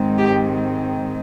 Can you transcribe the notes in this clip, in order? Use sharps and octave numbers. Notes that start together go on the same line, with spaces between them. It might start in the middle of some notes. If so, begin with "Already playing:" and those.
Already playing: G#2 D#3 G#3 C4
G4